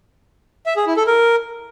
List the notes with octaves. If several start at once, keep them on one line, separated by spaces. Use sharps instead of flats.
E5
G#4
E4
A4
A#4